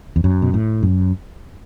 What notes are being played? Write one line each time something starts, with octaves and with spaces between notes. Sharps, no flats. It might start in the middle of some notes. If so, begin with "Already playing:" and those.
E2
F#2
B2
A2
F#2